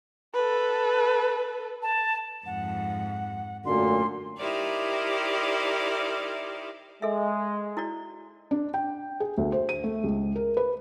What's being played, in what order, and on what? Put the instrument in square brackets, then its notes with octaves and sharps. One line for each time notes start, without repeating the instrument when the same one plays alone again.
[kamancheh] A4 B4
[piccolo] A5
[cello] F2 G#2 [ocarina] F#5
[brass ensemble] F#2 A#2 D3 [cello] A3 [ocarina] C6
[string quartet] D#4 E4 G4 A#4 C5 D5
[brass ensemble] G#3 [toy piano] A4 E5
[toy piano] E4 F#4 D5
[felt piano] D4
G5
G#4
D2
C5
D#7
A3
C#2
A#4
B4